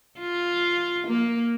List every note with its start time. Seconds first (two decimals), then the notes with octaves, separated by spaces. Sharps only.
0.19 F4
1.07 A#3